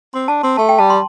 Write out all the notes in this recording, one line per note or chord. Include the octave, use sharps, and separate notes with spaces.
C4 C6
D4 A5
C4 C6
A3 A5
G5
G3 A5
C6